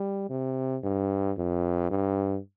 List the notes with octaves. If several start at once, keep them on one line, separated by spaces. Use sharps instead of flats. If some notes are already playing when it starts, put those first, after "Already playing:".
Already playing: G3
C3
G2
F2
G2